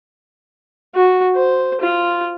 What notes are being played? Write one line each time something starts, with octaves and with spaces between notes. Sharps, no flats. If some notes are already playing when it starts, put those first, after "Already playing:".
F#4
C5
F4